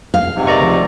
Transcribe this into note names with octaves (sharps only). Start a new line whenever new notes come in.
F5
G#2 C3
A#4 B4 D5 D#5 A#5 C#6
D2 F3